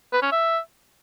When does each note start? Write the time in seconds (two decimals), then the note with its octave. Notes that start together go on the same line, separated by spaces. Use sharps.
0.13 B4
0.22 C#4
0.32 E5